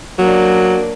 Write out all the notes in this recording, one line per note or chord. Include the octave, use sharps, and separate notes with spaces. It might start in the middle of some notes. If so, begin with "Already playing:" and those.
F#3 A#3 D4